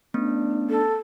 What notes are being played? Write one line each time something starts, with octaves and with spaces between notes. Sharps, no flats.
A3 B3 C#4 D4
A4